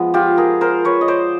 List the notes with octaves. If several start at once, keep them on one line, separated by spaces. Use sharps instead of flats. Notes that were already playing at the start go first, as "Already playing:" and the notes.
Already playing: F3 G#3 B3
F4 G4
G#4 A#4
A#4 C5
B4 C#5
D#5
C5 D5